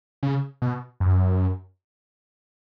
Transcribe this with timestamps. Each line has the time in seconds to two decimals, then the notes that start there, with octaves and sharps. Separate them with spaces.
0.23 C#3
0.62 B2
1.00 F#2